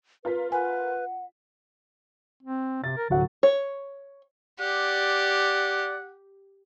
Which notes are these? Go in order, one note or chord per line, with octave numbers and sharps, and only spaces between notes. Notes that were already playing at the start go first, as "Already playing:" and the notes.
F4 A#4 B4 B6
B4 F#5 G#5
C4
C3 A6
A#4
D1 C3 F#3 F#5
C#5
G4 D5 F#5